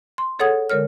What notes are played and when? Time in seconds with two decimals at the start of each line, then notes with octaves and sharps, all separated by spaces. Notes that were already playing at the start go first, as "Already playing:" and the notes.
0.18 C6
0.39 G#4 A4 C#5 F#5 D#6 G#6
0.70 D3 G#3 A#4 C#5 F6